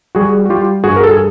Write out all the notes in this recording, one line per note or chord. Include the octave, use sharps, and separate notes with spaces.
G3 F#4 G#4
F#4
G3 F4 G4
G2 F#4 G#4
A#4
A4
G#4